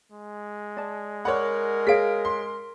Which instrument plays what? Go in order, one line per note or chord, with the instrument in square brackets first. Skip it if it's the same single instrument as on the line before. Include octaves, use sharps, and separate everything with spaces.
[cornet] G#3
[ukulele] D5 A5
[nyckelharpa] A#4 [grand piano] C#5 D5 F#5 [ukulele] B5
[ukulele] G#4 C#5 F5 [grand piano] B6 D7
[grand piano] C6